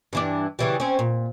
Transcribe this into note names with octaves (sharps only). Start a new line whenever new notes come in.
G2 E3 D4
C#3 E3 G3
C4 C#4
A#2